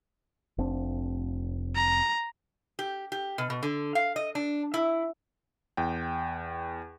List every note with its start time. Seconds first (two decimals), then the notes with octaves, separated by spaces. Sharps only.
0.58 F1 C4 D4
1.75 A#5
2.79 G4
3.12 G4
3.38 B2
3.50 B2
3.63 D3
3.95 F5
4.16 D#5
4.35 D4
4.74 E4
5.77 E2 G5